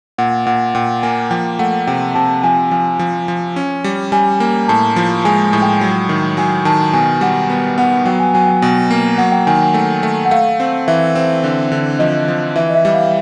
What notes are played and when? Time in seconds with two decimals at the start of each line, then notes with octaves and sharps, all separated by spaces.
0.18 A#2 F#5
0.46 A#2 F#5
0.75 A#2 G5
1.02 A#3 G#5
1.31 F3 G5
1.59 A3 F#5
1.87 C3 G5
2.15 C3 A5
2.43 F3 G#5
2.71 F3 G#5
2.99 F3
3.28 F3
3.56 C#4
3.84 G3
4.12 G3 G#5
4.40 A#3
4.68 A2 A5
4.96 F3
5.25 G#3 G#5
5.43 G#5
5.53 A2
5.62 G5
5.81 F#3
6.09 D#3
6.37 F#3 G#5
6.65 D#3 A5
6.93 B2 G#5
7.21 G3 F#5
7.50 B3
7.78 B3 F#5
8.05 F#3 G5
8.20 G#5
8.34 F#3 G#5
8.48 G5
8.62 B2
8.91 A#3
9.18 F#3 F#5
9.32 G5
9.47 D#3 G#5
9.61 G#5
9.74 A3 G5
10.03 A3
10.25 F#5
10.31 A3 F5
10.60 C4
10.88 E3 E5
11.15 C4
11.44 D3
11.72 D3
11.99 F3 D#5
12.28 F3
12.56 E3 E5
12.70 D#5
12.75 E5
12.85 G3
12.94 F5